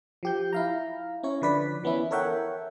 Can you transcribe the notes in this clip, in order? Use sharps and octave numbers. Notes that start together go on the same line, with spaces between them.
F3 G4 G6
E4 F5 A#5
C#4 E4 C#5
D3 F3 B4 D5 B6
E3 B3 C#4 E4
A4 A#4 C#5 E5 F#5 G5